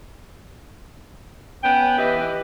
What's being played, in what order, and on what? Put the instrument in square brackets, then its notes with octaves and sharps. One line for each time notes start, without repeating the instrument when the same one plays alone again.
[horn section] B3 C#4 G5
E3 E4 G4 B4 D#5